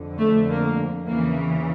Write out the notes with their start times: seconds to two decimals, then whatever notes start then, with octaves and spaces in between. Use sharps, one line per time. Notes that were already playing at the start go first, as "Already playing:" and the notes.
Already playing: F2 D3
0.18 A3
0.49 A#3
1.07 E2 C#3 E3 A#3